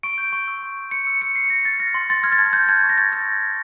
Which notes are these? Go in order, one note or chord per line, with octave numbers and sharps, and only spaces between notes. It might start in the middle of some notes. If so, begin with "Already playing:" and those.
C#6 D7
G6
C#6
E6
C6
G6
C6 C#7
E6
F6 C#7
C#6 C7
C#6 A#6
F6 A6
F6 A#6
C6
C6 A6
F6 G#6
A6
A5 G#6
F6 G6
A5 G#6
C#6
A#6
G6 A6
E6 G#6
A5
C#6